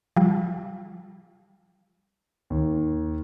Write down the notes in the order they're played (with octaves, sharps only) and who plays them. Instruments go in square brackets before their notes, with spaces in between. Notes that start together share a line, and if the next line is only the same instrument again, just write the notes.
[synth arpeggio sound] F3 G3
[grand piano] D#2